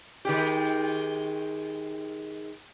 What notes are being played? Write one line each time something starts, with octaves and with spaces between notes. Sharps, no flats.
D#3 G#3 G4